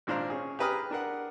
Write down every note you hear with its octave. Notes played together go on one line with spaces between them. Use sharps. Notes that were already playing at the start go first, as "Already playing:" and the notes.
G#1 A#2 D4 C5 F5 A#5
C#4 G#4
G4 G#4 B4 A#5 D#6 F6
D4 A#4 F#5